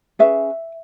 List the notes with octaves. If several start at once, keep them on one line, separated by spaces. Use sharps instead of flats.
C#4 G#4 B4 E5